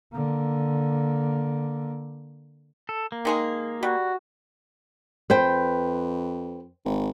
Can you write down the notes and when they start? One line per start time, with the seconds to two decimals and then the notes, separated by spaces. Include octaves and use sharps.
0.13 D3 A#3
2.89 A4
3.12 A#3
3.25 D#3 G#3 G#4
3.83 G3 F#4
5.30 F2 B4 C5 G5
6.85 G#1